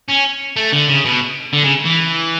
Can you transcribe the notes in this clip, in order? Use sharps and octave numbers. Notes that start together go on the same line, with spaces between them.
C#4
A3
D3
C#3
B2
D3
C#3
E3